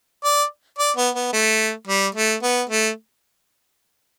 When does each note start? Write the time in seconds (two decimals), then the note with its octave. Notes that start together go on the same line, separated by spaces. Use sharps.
0.24 D5
0.79 D5
0.97 B3
1.15 B3
1.33 A3
1.88 G3
2.15 A3
2.43 B3
2.70 A3